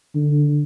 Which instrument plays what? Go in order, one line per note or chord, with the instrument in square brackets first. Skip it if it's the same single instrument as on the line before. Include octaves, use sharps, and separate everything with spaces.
[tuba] D3